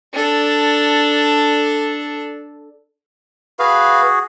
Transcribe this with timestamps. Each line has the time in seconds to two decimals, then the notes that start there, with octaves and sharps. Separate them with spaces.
0.13 D4 A4
3.59 F#4 G#4 B4 F5